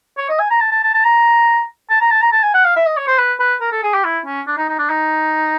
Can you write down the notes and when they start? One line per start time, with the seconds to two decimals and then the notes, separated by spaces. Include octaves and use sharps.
0.18 C#5
0.29 D#5
0.39 G#5
0.50 A#5
0.61 A5
0.71 A5
0.83 A5
0.94 A5
1.04 A#5
1.90 A5
2.01 A#5
2.11 A5
2.22 A#5
2.32 A5
2.43 G#5
2.54 F#5
2.65 F5
2.76 E5
2.86 D#5
2.97 C#5
3.07 C5
3.18 B4
3.40 B4
3.61 A#4
3.72 A4
3.83 G#4
3.94 G4
4.04 E4
4.26 C#4
4.47 D4
4.58 D#4
4.69 D#4
4.79 D4
4.89 D#4